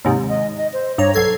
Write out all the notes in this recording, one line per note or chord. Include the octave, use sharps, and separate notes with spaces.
D#2 G#2 C3
D#5
D#5
C5
G2 C#5 A#5
B1 A4 G#6 C7